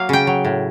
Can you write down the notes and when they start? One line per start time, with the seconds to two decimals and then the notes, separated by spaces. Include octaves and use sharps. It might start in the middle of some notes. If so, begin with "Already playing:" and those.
Already playing: F#3 A#3 F5
0.09 C#3 G5
0.27 F#3
0.45 A2